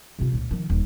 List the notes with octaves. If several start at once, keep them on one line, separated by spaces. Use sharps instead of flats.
C3 F4
C#2 A#2
D#3 F3
D#1 E3